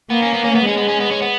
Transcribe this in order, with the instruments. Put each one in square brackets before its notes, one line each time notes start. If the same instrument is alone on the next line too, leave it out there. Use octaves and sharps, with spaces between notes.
[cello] A#3 [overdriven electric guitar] B3
[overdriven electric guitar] C#4
B3
C#4
B3
[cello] G#3 [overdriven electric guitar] C#4
[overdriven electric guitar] B3
C#4
B3
C#4
B3